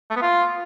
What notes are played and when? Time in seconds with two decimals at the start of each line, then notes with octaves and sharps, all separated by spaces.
0.10 A3
0.16 B3
0.22 F4